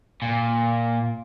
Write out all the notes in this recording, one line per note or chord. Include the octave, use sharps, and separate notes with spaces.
A#2